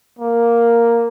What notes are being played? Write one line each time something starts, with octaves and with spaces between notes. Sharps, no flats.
A#3